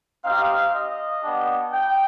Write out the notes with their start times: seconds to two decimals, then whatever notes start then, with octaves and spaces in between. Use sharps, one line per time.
0.24 C4 D#4 G4 F5
0.74 D#5
1.22 B3 D4 G4
1.73 G5